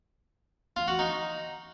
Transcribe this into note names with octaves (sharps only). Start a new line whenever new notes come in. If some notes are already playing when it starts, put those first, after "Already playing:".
F4
F#4
D#4